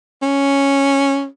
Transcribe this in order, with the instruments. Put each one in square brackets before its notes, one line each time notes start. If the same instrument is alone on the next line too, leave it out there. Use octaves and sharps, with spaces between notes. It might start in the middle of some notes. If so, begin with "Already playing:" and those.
[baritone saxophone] C#4